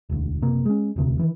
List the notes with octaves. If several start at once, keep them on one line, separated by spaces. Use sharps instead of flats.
E1 D2
F#1 C3 A#3
G#3 C#4
E1 D2 C3
D#3 E3